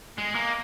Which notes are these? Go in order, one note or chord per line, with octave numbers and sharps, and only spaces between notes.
G#3
A#3